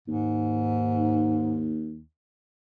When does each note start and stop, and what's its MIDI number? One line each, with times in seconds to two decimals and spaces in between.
0.08 2.03 39
0.08 1.72 44